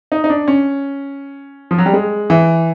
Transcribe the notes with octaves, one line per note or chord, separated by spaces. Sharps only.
D#4
D#4
D4
C#4
F3
F#3
G3
G#3
E3